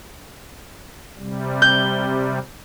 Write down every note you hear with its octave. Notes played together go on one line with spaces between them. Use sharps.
C3 G3
G6